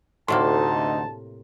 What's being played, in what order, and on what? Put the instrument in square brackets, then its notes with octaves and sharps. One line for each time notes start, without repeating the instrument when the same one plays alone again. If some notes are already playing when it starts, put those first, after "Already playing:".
[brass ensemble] D2 D#4 [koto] A2 C3 A#3 [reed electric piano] F#5 C6 [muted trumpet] A5